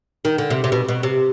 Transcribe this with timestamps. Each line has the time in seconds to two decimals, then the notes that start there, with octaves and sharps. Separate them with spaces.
0.25 D#3
0.38 D3
0.50 C3
0.64 C3
0.72 B2
0.88 B2
1.03 C3